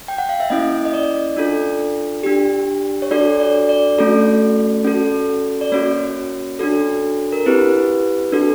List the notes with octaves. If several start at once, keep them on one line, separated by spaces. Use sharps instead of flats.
G5
F#5
F5
E5
A#3 C#4 E4 D#5
D#5
D5
D4 F4 A4
D4 G4
C#5
D4 F#4 A4 D5
D5
D5
A3 C#4 F#4 A4
C#4 F#4 A4
D5
A#3 C#4 F#4 C#5
D4 F#4 A4
A#4
C4 E4 G4 B4
D4 F#4 A4